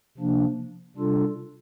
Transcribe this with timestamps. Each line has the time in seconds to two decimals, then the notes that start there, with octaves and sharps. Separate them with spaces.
0.18 C3 F3 A#3 D4
0.96 C3 G3 D4 F4 A4